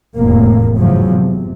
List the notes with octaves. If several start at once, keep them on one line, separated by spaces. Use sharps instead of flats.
F1 E2 A2 A#3
E2 G#2 C#3 F3 F#3
C3